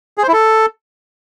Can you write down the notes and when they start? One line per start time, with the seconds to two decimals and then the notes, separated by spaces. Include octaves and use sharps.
0.18 G#4
0.23 C5
0.28 E4
0.33 A4